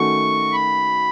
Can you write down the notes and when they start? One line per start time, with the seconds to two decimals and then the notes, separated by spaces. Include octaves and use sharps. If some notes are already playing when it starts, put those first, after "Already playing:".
Already playing: D#3 A3 C#4 F#4 C#6
0.52 B5